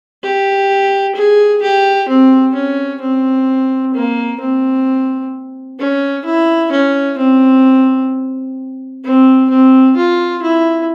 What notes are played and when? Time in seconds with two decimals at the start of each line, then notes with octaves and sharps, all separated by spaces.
0.23 G4
1.15 G#4
1.62 G4
2.08 C4
2.55 C#4
3.01 C4
3.94 A#3
4.40 C4
5.79 C#4
6.25 E4
6.72 C#4
7.18 C4
9.04 C4
9.50 C4
9.97 F4
10.42 E4